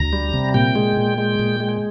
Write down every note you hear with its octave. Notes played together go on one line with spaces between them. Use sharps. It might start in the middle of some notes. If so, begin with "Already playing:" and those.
Already playing: D2 A#5
G3
C3
A#2 G5
G#3
A#2
G#3
A#2
G#3